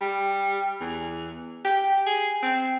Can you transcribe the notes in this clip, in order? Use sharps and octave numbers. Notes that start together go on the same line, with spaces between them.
G3
E2
G4
G#4
C4